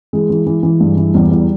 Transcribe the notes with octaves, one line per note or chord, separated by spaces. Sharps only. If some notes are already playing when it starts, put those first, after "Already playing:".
E3 G#3
E3
E3
E3
G2
E3
E2 G3
E2